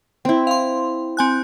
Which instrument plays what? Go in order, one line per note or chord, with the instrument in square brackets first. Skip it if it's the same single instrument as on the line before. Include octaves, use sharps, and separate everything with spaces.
[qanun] C4 E4
[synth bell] F5 C6
C4 G#5 F#6